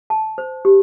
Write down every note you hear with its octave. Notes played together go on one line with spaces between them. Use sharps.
A5
C5
G4